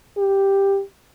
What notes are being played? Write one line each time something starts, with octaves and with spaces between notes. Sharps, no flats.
G4